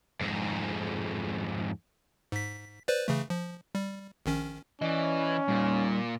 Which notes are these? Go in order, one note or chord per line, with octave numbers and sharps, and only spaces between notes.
F2 G#2
G#2 B6
B4 C5 D5
C#3 E3 A3
F3
G3
A#1 D#3 C#4
E3 C#4 D5 D#5
A#2 G3 D#4